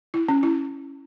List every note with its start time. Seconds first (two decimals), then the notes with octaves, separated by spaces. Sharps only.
0.14 E4
0.29 C#4
0.43 E4